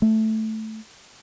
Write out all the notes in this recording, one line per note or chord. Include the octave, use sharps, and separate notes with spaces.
A3